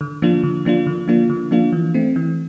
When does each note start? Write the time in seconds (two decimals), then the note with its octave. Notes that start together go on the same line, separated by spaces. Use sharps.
0.01 D3
0.22 F3 A#3 D4 F4
0.43 D3
0.65 F3 A#3 D4 F4
0.87 D3
1.08 F3 A#3 D4 F4
1.30 D3
1.51 F3 A#3 D4 F4
1.73 E3
1.94 A3 C4
2.16 E3